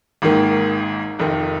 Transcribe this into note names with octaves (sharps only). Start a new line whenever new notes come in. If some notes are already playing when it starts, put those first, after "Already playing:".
G#1 G#2 D#3 A#3
F1 F2 D#3